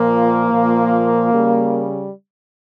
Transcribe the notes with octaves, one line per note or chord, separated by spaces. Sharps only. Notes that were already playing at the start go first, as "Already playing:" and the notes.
Already playing: A#2 F3 A#3
A#2 F3
C#3 G3